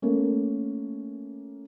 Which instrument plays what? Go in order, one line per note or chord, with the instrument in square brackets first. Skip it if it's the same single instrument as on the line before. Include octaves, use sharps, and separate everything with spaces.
[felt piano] A3 A#3 C#4